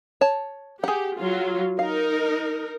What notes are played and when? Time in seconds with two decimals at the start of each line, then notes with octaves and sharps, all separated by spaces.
0.21 C#5 A5
0.84 G4 G#4 F#5
1.19 F#3 F4
1.79 D#4 A#4 F5